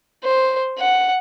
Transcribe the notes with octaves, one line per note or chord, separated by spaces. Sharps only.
C5
F#5